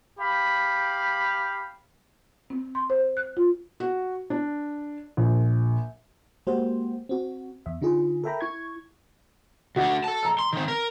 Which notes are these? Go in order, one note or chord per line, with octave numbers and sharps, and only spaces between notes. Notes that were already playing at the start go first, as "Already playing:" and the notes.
G4 F5 B5
C4
C6
C5
F#6
F4
F#4
D4
A#1
G#3 A#3 F#4 G4 C5
C4 F#4
E2 E5
D3 D#4 F4 G#4
A4 A#4 E5 G5 A#5 B5
E4 C#6 G#6
D2 D3 F#4
A4 A5
A#5 E6
C6
D#3 C4
A#4